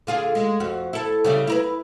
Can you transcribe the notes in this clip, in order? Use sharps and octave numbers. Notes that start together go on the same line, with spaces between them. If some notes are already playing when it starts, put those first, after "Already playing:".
D3 F4 G#4
G#3
F2 F#4
E4 A4
C#3 G3 E4
E4 A#4 B4